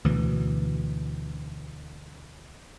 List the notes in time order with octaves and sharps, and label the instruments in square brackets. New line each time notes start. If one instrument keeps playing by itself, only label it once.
[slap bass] D2 B2 E3